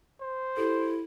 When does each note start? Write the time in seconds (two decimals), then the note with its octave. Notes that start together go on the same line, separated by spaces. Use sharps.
0.20 C5
0.57 E4 G4 A4